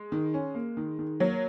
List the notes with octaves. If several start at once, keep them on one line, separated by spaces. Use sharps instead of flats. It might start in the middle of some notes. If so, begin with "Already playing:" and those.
Already playing: G#3
D#3
C#4
A#3
D#3
D#3
F#3 A#3